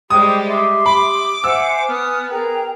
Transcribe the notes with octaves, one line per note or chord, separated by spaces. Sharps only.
G3 G#3 G4 C5 G5 D#6
E5 C6
B5 D6
C5 E5 F#5 G#5 E6
B3 D#6 F6
G#4 A#4 G5 A#5